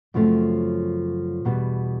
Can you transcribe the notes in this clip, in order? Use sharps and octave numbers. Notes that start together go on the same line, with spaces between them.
F#2 C#3 F3 A3 C4
E2 B2 G3